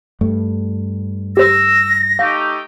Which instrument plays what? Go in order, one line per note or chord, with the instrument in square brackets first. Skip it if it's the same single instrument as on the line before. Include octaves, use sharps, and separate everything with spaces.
[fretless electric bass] G2 A3
[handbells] G4 C5 [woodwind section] E6 [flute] A#6
[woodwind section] A3 D#4 G4 [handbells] F5